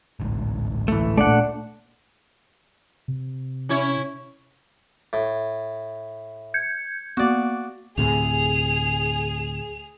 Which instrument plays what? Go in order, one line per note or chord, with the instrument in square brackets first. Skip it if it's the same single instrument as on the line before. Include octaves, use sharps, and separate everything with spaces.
[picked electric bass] A1 D2 G#2
[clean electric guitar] E3 A3
[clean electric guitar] A#2 D5 [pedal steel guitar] A3 D4 F#5
[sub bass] C3
[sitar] C#4 E4 C#5
[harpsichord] A2
[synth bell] G6 G#6 C#7
[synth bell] A#3 B3 [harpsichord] F#4 D5
[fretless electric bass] D2 A2 C3 [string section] G#4 [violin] F7